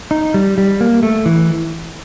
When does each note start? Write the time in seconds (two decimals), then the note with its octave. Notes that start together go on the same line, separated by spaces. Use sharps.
0.11 D#4
0.34 G3
0.58 G3
0.81 A#3
1.03 A3
1.26 E3